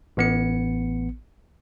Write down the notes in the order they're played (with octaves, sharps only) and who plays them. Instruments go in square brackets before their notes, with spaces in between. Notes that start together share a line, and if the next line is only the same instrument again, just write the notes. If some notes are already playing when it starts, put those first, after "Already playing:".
[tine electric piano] A1 B3 C#7